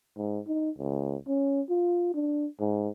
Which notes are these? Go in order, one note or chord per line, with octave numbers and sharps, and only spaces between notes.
G#2
D#4
C#2
C#4
F4
D4
G#2